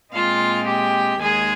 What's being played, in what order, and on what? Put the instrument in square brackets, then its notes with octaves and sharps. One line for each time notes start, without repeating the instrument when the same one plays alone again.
[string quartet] A#2 G#3 C4 F4 F5
G4 G5
D#2 D#3 G#3 G#4 G#5